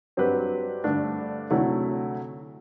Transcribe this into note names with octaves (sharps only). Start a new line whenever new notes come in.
G2 F#3 C4 G4 B4
G2 D3 A3 D4
D2 C3 F#3 A3 E4